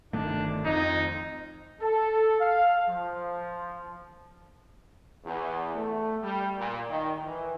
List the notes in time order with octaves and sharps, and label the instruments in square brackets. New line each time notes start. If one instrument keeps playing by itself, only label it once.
[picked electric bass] G1 D#3 A3 [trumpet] D4
[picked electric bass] F2 [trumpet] D#4
[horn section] A4
F5
F3
[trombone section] E2
A3
G3
A#2
D#3
E3